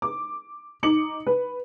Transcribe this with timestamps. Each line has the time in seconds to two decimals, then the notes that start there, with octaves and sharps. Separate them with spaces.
0.02 D6
0.83 D#4 D6 C#7 F#7
1.26 B4